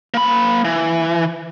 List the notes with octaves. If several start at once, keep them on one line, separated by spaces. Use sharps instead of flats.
A#3 B5
E3